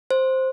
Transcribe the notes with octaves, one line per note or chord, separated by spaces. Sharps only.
C5